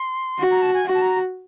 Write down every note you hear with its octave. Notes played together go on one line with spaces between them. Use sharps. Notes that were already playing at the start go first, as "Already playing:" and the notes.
Already playing: C6
F#4
A#5
A5
G#5
F#4
A5
A#5